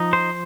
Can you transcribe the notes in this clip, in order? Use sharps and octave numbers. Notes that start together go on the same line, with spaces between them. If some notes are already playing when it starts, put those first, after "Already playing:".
Already playing: F3 D#4
C5